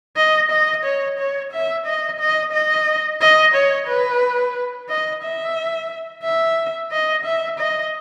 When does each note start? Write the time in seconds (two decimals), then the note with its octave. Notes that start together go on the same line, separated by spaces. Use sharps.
0.17 D#5
0.50 D#5
0.84 C#5
1.18 C#5
1.52 E5
1.86 D#5
2.20 D#5
2.52 D#5
3.21 D#5
3.54 C#5
3.87 B4
4.89 D#5
5.23 E5
6.23 E5
6.92 D#5
7.25 E5
7.59 D#5